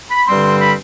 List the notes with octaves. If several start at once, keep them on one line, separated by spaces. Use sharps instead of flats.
B5
G2 D3 G3 C4 C6
B5